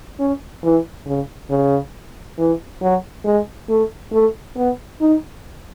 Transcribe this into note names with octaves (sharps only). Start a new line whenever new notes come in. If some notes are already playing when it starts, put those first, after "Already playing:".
C#4
E3
C#3
C#3
E3
F#3
G#3
A3
A3
B3
D#4